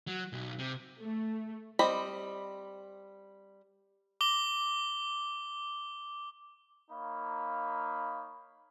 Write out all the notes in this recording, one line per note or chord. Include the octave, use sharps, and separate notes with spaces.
F#3
B1
C3
A3
G3 C4 D#5 B5
D6 G7
A#3 D#4 C#5 F5 B5